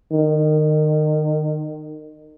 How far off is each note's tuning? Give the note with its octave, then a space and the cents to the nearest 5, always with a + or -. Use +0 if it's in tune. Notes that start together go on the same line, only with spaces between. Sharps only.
D#3 -25